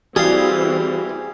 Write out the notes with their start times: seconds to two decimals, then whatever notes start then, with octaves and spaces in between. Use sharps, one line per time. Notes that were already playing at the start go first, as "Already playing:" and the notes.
0.16 E3 G3 C4 F#4 G#4 F5 D#6